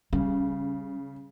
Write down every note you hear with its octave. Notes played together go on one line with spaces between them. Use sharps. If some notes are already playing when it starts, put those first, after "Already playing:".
C#3 G3